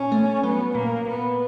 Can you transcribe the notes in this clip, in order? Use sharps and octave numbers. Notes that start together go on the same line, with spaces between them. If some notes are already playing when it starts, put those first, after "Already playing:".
Already playing: A#2 C#4
A3
F#3 B3
A#2 A#3
A#2 B3